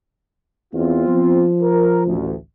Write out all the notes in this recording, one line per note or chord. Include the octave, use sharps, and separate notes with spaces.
E2 B3 C4 F4
F3
A#4
A1 D2